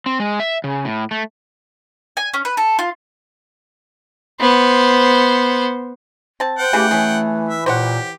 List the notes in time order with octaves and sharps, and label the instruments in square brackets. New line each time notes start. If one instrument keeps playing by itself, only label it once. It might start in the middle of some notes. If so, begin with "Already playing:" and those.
[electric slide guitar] C4
G#3
E5
C#3
A2
A3
[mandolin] G#5
C#4
B4
A4
F4
[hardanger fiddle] B3 C5
[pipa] C4 A5
[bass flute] C5 [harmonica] F#5 G5
[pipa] C#3 E3 G#4 [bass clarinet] A3 [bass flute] G4
[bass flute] E3 [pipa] C#4 G#4
[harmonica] E5
[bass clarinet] A#2 [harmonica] G4 [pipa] C5 C#5 F#5